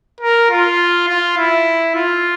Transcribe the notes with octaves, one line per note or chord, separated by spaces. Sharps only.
A#4
F4
F4
E4
F4